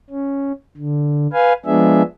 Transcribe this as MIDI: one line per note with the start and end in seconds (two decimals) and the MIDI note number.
0.10 0.52 61
0.77 1.27 50
1.33 1.53 71
1.33 1.53 77
1.33 1.53 80
1.66 2.02 53
1.66 2.02 56
1.66 2.02 59
1.66 2.02 62
1.66 2.02 68
1.66 2.02 76